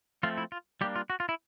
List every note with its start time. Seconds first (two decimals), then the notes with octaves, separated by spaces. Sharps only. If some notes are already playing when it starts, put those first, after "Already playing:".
0.23 F3 A3 C4 F4
0.38 E4
0.52 F4
0.81 G3 A#3 D4 G4
0.96 F4
1.10 F#4
1.20 F4
1.29 E4